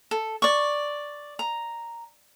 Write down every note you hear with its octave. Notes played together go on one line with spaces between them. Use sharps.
A4
D5 C#6
A#5